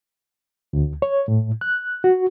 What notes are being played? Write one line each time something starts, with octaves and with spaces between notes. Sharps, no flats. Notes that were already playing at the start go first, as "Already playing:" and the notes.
D2
C#5
A2
F#6
F#4